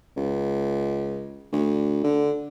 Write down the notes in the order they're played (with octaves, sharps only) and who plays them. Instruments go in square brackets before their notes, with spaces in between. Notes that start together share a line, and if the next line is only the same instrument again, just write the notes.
[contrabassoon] C#2
D2
D3